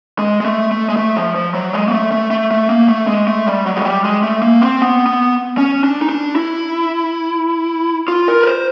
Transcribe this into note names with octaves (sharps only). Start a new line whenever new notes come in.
G#3
G#3
A3
A3
G#3
A3
F3
F3
F#3
G#3
A#3
A3
A3
A3
A3
A#3
A3
G#3
A3
G3
F#3
G#3
G3
G#3
A3
A#3
C4
B3
B3
C#4
D4
D#4
D4
E4
F4
A#4
B4
C5